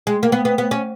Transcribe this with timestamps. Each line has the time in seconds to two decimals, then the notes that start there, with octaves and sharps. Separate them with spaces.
0.07 G#3
0.23 A#3
0.32 B3
0.45 B3
0.58 B3
0.71 C#4